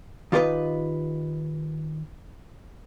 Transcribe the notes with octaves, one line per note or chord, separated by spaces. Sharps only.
D#3 F4 G4 A#4 B4 D#5